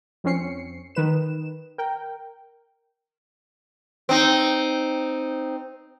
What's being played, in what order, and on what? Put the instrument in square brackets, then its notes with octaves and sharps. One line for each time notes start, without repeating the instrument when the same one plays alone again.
[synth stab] F2 C4 C#4 C7 C#7
D#3 B4 E7
A#4 G5
[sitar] C4 D#4